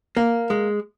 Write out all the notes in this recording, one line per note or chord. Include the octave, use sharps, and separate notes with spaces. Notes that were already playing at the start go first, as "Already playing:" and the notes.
A#3
G#3